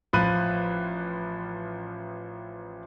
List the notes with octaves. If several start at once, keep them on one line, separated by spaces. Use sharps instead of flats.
A1 F3 B5 F#6 D#7